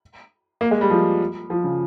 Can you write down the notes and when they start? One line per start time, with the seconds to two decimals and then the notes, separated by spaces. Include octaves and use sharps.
0.61 A#3
0.71 G#3
0.81 G3
0.90 F3
1.50 F3
1.64 C#3